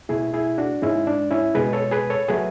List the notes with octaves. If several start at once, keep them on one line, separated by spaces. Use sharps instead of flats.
B2 A3 E4 G#4
E4 G#4
D4 F#4
G#2 G#3 C#4 E4
D4
C#4 E4
B2 G#3 G#4 B4
A4 C#5
G#4 B4
A4 C#5
F#3 A3 G#4 B4